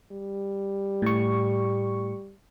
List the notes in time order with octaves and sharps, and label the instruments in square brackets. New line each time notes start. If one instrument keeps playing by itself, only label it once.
[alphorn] G3
[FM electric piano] A2 C#6